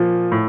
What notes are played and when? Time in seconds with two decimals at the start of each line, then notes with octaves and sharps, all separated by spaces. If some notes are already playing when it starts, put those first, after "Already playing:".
Already playing: A#2 F3
0.32 A2